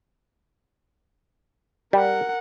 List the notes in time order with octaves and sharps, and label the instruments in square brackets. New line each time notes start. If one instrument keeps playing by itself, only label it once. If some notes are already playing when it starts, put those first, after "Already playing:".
[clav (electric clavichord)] G3 [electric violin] A#4 F#5